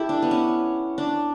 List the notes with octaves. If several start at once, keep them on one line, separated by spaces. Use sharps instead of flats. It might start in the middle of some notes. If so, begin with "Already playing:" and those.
Already playing: E4 G4 A4
D4
B3
C#4
D4